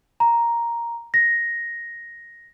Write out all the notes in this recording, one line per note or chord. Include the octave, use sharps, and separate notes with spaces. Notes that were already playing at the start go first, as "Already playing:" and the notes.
A#5
A#6